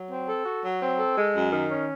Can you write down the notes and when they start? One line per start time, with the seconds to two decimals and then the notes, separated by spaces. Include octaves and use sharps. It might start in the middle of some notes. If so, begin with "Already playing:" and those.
Already playing: F#3
0.10 C4
0.28 A4
0.46 F#4
0.64 F#3
0.80 C4
0.98 A4
1.16 G#3
1.34 F#2
1.52 D#3
1.70 C#4